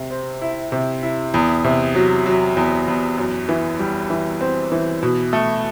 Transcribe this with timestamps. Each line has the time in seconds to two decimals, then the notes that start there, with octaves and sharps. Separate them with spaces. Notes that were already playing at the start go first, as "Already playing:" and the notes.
Already playing: C3
0.11 C4
0.41 E4
0.72 C3
1.03 E4
1.34 E2
1.64 C3
1.95 F#3
2.26 F#3
2.57 E2
2.88 E2
3.18 F#2
3.49 E3
3.79 G3
4.10 E3
4.41 C4
4.72 E3
5.02 B2
5.33 A3